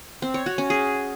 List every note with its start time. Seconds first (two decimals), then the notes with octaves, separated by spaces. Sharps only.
0.22 C4
0.34 C#5
0.46 F#4
0.58 C#4
0.70 G#4